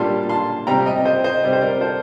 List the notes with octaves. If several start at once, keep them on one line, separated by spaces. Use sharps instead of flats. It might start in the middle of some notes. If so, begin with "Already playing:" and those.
Already playing: A#2 G3 A#3 D4 A5 C6
A5 C6
C3 G3 C4 G5 A#5
D#5 G5
C5 D#5
C5 D#5
C3 G3 C4 D5
C5
A#4 D5
A4 C5